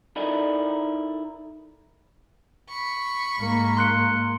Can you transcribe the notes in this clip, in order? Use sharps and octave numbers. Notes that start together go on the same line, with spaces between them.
D#4 E4 A4 A#4 D5 D#5
B5 C#6
G#2 A#3
C6 F#6 C#7